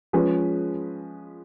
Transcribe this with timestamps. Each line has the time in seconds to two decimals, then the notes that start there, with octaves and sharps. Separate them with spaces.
0.13 F3 G#3 C#4 G#4 B4